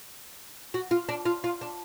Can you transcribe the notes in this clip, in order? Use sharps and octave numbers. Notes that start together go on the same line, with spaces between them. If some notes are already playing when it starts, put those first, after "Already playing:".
F#4
F4
D4
F4
F4
D4